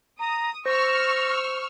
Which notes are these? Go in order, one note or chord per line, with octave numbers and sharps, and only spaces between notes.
A#5 D#6
C5 C#6 E6 F6 A#6